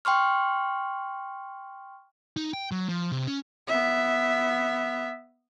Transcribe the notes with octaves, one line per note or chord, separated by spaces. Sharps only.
G5 C6 C#6 F6
D#4
G5
F#3
F3
C3
C#4
B3 E5